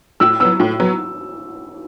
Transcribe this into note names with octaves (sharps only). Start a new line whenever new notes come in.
A2 E6
F#3 B3 E6
A2
F#3 B3